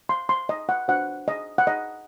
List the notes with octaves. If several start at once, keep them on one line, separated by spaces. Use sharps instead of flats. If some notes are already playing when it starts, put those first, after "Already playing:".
C6
C6
D#5
F#5
D4 F#4 C5 F#5
D#5
F#5
D#5